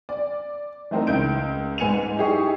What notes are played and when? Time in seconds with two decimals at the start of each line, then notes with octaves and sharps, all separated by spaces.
0.09 D5
0.91 E3 A3 C4 D#4 A#4
1.07 C#2 G6 D7
1.78 G#2 B4 G#5 C#7 D#7 F7
2.17 D#4 E4 G4 G#4 C#6